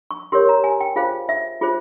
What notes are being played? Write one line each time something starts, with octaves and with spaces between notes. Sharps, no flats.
C#6
G4 A#4 C#5 C6
A#5
G#5
G5
F4 G#4 C5 F5
E5
F4 G#4 C5